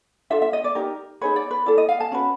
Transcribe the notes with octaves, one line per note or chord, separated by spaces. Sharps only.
D4 F4 A4 E5
E5
D#5
D5
D#4 G4 A#4
D#4 G#4 B4 C#5
D5
B4
E4 A4 D5
D#5
F5
A5
C#4 F#4 B4